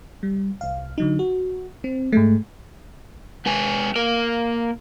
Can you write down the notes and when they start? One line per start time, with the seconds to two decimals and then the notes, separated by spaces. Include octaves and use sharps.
0.23 G3
0.61 C2 F5
0.98 D3 F#3 D#4
1.19 F#4
1.84 C4
2.12 G#2 G#3 A3
3.46 G#3 B4 G#5
3.96 A#3 A#4